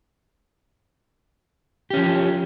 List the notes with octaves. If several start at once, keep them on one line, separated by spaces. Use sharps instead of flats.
F3 C#4 G4